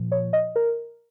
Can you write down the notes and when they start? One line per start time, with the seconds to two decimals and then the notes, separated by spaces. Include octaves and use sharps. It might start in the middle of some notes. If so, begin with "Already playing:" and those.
Already playing: A#2 F3
0.12 C#5
0.33 D#5
0.56 A#4